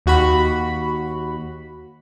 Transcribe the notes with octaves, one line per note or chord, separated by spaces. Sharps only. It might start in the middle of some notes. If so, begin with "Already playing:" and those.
D#2 F#4 B5